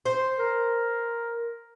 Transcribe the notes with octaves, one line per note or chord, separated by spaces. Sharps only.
C5
A#4